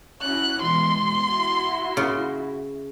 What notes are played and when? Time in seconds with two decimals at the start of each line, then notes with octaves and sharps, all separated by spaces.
0.22 C#4 E4 F#4 F#6
0.62 B2 E3 G#3 C6
1.27 E4 F#4
1.97 C#3